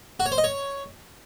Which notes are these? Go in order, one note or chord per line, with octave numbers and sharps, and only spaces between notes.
F#4
C#5
C5
D#5
C#5